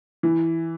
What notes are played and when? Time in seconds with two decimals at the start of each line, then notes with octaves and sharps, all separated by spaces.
0.23 E3